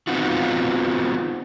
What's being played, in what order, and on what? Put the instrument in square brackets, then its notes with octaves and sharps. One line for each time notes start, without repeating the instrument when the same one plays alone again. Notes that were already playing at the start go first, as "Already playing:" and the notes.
[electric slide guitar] B3 C4 D#4 F4 F#4